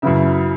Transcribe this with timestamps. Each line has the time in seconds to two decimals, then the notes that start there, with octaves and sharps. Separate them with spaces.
0.02 F#2 C#3 F#3 E4 B4 E5